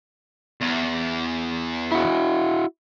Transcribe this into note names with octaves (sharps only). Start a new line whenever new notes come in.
E2
E4 F#4